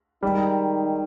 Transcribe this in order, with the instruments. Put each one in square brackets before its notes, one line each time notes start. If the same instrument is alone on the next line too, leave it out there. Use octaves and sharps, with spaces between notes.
[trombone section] D#3 G#3 D#4 [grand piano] G3